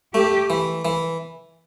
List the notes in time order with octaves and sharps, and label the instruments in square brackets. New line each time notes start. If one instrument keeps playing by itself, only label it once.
[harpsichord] A3 [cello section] G4
[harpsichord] E3
E3